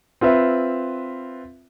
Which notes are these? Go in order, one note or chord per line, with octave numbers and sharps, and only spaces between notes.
C4 F4 B4 E5